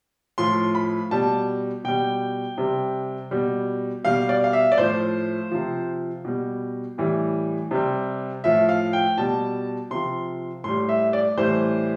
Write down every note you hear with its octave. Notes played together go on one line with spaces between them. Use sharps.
A2 F3 C6
B5
B2 G3 A5
B2 G3 G5
C3 G3
B2 G3
B2 G3 F5
D5
F5
E5
D5
A2 F3 C5
C3 F3
B2 G3
A2 E3 G3
C3 G3
A2 F3 E5
F5
G5
B2 G3 A5
C3 F3 C6
A2 G3 C6
E5
D5
A2 E3 G3 C5